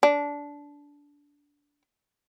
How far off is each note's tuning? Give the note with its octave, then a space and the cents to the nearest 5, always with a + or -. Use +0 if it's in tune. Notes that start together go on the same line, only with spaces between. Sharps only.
D4 -20